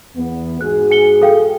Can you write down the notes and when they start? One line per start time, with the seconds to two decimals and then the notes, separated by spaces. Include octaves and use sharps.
0.16 E2 B3
0.61 G#2 F#4 G#4 F#6
0.91 G#5 C#7 G7
1.22 A4 F5 G5